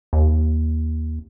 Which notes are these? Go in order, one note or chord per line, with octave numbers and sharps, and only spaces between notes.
D#2